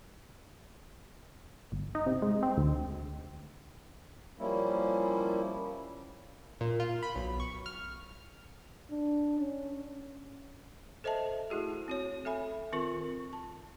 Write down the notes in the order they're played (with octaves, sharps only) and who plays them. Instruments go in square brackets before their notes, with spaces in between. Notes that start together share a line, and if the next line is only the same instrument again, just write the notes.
[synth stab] G1
D#4
C3
G#3
C4
D2
[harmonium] F3 G3 A#3 C#4 E4
[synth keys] A#2
F4
B5
B1
C#6
F6
[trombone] D4
C#4
[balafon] A4 C5 D#5 E5 A5
A3 E4 F#4 G#4
C4 F#4 C#5
A4 E5 G#5 B5
D#3 C4 F4 A#4 C#6
A5